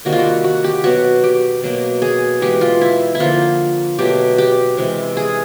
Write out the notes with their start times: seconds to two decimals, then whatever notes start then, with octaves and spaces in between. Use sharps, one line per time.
0.05 C3 D#3 G3 A#3 F#4
0.12 F4
0.19 F#4
0.44 F#4
0.64 G4
0.84 B2 F#3 B3 F#4
1.24 G4
1.63 B2 F#3 A#3
2.02 G#4
2.41 E3 G#3 B3 G4
2.61 F4
2.81 E4
3.15 E4
3.20 D3 F3 A#3 F4
3.99 B2 F#3 A3 G4
4.38 G4
4.77 C3 E3 G#3
5.17 G#4